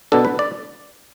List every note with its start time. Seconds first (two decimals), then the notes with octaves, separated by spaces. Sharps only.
0.12 B2 B3 D4 A4
0.25 B4
0.39 D5